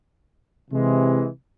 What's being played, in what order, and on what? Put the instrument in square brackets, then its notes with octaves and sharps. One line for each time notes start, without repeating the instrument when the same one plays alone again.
[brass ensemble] C3 E3 G#3